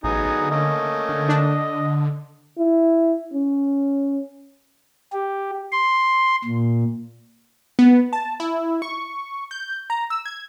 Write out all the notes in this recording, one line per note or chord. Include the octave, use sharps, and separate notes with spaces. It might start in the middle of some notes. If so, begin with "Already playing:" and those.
A1 F#3 B3 D#4 G#4
D3
A3 A#3 C#4 D#5
D3
D4
E4
C#4
G4
C6
A#2
B3
A5
E4
C#6
G6
A#5
E6
G#6